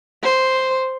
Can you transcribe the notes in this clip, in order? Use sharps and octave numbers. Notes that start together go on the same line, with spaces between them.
C5